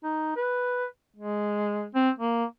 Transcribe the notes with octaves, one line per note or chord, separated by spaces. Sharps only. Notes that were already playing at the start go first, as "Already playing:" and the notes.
D#4
B4
G#3
C4
A#3